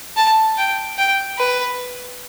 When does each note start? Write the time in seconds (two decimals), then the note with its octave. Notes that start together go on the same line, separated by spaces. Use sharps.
0.16 A5
0.57 G5
0.98 G5
1.38 B4